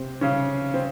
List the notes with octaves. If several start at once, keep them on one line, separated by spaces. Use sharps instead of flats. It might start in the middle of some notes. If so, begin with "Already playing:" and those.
Already playing: C3 C4
C#3 C#4
C4